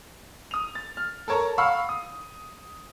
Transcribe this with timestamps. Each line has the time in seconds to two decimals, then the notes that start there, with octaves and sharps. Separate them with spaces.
0.51 D#6 F7
0.75 A6
0.97 F6
1.28 A4 A#4 C#5 A5 A#5
1.58 F5 F#5 B5 C#6 E6 F6
1.89 D#6